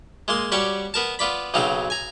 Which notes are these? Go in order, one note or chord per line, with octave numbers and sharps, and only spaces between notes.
G#3 A#3 C6 D#6
G3 C#4 F#4 D5 G5 C#6
B3 A#4 A5
B3 F4 D5 B5
B1 C#3 F#3 C4 D#4 F5
G#5 A#5